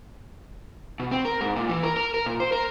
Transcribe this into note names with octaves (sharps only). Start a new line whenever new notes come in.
B2
C4
A#4
G#2
A#2
E3
A#4
A#4
A#4
A#2
C5
A#4